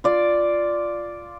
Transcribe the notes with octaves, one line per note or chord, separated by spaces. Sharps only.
F4 D5